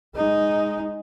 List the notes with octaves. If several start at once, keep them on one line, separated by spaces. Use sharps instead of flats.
G#3 D#4